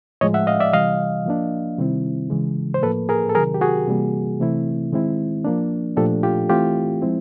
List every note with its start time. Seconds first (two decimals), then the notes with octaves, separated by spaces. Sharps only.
0.21 A2 F3 G#3 C#5 D#5
0.34 E5 F#5
0.47 D#5 F5
0.60 D5 E5
0.73 C3 E3 G3 D#5 F5
1.26 F3 A#3 D4
1.78 C3 D#3 G3 C4 E4
2.30 C#3 E3 G#3
2.74 C5
2.83 A2 F3 A#3 A4 B4
3.09 G#4 A#4
3.30 A4
3.35 C3 D#3 F#3 G#4 A#4
3.54 G4
3.61 F#4 G#4
3.87 C3 E3 G3 A#3
4.40 C3 E3 A3 C4 E4
4.92 D#3 G#3 C4 E4
5.45 F3 A#3 D4
5.97 A#2 F3 A3 D4 G4 A4
6.23 F4 G4
6.49 E3 A3 C4 E4 F4 G4
7.02 F3 G#3 C4 E4